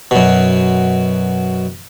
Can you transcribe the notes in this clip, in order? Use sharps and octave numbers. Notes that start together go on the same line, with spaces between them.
F#2 B2